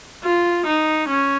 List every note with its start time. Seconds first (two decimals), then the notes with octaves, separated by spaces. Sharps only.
0.24 F4
0.66 D#4
1.09 C#4